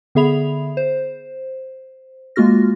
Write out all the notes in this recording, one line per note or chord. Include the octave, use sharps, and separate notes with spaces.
D3 B3 G#4 E5 B5 F7
C5
G#3 A#3 F4 F#4 F6 A#6